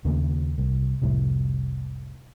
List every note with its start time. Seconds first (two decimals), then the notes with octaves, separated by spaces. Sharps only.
0.05 D#2 C#3 A3 A#3
0.58 C2
1.02 F1 C2 A2